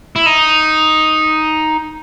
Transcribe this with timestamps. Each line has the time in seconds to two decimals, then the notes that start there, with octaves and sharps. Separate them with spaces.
0.16 E4
0.26 D#4